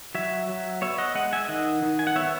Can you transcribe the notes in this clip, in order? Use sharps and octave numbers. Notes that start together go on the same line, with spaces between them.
F#3 C#5 E5
F#3
B3 C#5 E5
D#5 F#5
G#3 D#5 F#5
E5 G#5
E5
D#3 D#5 F#5
D#3
G#5
F#5
B3 C#5 E5